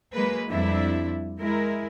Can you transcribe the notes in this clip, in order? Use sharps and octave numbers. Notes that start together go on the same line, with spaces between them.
F#3 G#3 A#3 B4
F2 G3 C4 D4 E4 E5
G#3 E4 A#4